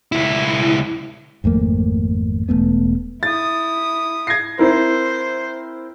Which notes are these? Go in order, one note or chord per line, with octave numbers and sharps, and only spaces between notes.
C#2 E4
G#1 F2 A3 A#3
E1 A2 A3 B3
E4 D#6 A6
G#6 A#6 C7
C4 E4 A#4 C5